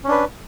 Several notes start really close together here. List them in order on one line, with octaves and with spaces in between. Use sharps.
C#4 D4 B4